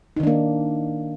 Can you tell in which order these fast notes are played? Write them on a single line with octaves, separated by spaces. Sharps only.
D#4 D#3 D4 A#3